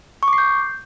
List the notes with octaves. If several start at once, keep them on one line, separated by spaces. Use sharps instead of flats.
C#6
D6
C7
G6